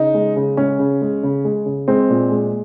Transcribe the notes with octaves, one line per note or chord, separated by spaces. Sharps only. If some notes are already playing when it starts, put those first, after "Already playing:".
Already playing: C#3 D#4
G#3
C#3
G#3 C#4
C#3
G#3
C#3
G#3
C#3
G#3 C4
A#2
G#3